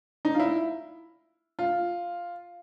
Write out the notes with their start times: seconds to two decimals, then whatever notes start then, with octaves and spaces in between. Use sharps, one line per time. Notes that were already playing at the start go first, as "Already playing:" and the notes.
0.25 D#4
0.35 F4
0.40 E4
1.59 F4